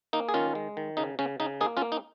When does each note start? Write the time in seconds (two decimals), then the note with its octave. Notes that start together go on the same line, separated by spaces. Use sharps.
0.13 A#3 D#4
0.29 G#4
0.34 D#3 C#4 F4
0.55 G#3
0.77 D#3
0.97 C#3 D#4
1.19 C#3 C#4
1.40 C#3 D#4
1.60 A#3 D#4 G#4
1.77 C#4 F4
1.82 A#3
1.92 D#4